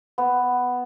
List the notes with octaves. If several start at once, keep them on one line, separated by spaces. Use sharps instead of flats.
B3